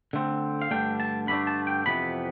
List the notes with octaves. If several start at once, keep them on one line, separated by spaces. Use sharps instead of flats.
D3 A3 C4
F5
G2 D3 A3 D4 G5
A5
G2 D3 A3 D4 B5
A5
G5
F2 C3 E3 B3 B5